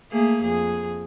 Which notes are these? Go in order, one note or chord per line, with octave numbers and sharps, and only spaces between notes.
A3 A#3 G#4
F2 G#4